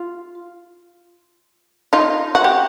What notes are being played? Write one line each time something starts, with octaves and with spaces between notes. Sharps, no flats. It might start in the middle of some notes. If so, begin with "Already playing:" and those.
Already playing: F4
D#4 F4
F#4
G4